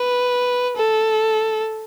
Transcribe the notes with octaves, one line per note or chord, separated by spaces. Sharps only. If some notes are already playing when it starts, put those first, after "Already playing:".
Already playing: B4
A4